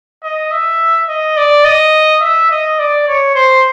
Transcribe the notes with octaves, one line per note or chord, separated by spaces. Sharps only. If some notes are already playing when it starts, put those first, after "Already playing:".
D#5
E5
D#5
D5
D#5
E5
D#5
D5
C#5
C5